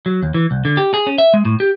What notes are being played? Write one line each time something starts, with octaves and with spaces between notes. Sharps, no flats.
F#3
D#2
E3
C2
D3
G4
G#4
C#4
E5
G#3
A2
G4